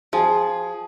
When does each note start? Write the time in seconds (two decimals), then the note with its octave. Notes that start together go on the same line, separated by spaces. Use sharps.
0.13 F3 G#4